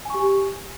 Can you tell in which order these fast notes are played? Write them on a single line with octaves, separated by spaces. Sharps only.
G#5 C#6 G4